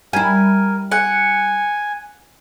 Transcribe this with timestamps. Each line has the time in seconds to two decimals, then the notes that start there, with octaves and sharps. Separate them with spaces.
0.13 G3 E4 A#4 G#5
0.92 F#5 G#5